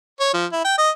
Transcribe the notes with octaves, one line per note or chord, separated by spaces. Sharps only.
C#5
F3
E4
G5
D#5